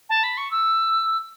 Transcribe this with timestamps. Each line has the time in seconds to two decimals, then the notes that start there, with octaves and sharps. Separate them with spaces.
0.09 A5
0.23 B5
0.37 C#6
0.51 E6